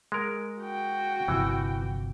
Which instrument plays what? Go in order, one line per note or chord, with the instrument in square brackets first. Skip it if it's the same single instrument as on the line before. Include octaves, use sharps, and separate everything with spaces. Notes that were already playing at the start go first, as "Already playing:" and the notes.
[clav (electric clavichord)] G#3 A#4
[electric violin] F#4 G5
[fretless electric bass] G1 C3 F3 [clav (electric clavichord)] E3